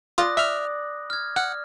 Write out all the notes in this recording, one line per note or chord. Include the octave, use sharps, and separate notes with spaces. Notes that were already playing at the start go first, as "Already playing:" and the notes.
F4 D5 B5 D#6 F#6 A#6
E5 F6
F6 G#6
F#5 F6